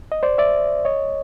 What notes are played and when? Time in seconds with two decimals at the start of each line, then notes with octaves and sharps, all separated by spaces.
0.12 D#5
0.23 C5 D5
0.38 D5 E5
0.85 C#5 D#5